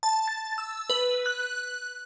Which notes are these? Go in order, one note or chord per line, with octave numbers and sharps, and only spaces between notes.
A5
A6
E6
B4
F#6